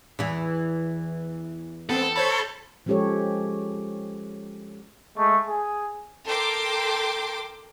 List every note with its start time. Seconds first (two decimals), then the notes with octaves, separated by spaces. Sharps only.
0.19 E2 E3
1.89 B3 C4 A4
2.16 C5 C#5 B5
2.86 F3 G#3 C#4 G4 A4 C#5
5.16 G#3 A3
5.48 G#4
6.26 A4 A#4 G5 C6 D6